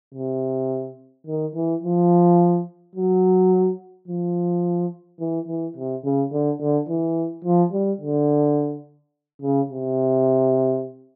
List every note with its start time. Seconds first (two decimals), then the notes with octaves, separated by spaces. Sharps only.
0.14 C3
1.27 D#3
1.55 E3
1.83 F3
2.95 F#3
4.08 F3
5.20 E3
5.48 E3
5.76 C3
6.04 C#3
6.32 D3
6.61 D3
6.89 E3
7.45 F3
7.73 G3
8.01 D3
9.42 C#3
9.69 C3